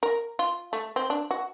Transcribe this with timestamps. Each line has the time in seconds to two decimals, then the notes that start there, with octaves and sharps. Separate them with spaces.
0.03 A#4
0.39 F4
0.73 A3
0.96 C4
1.10 D4
1.31 F#4